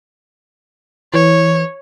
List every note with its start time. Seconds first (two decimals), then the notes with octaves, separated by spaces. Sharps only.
1.14 E3 C#5